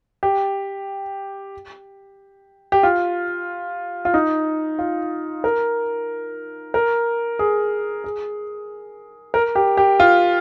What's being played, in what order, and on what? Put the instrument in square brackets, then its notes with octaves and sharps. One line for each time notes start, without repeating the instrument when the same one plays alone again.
[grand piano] G4
G4
F4
F4
D#4
F4
A#4
A#4
G#4
G#4
A#4
G4
G4
F4